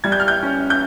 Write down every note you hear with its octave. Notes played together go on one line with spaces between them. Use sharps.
G3 G#6
G6
F6
G6
C#4
G6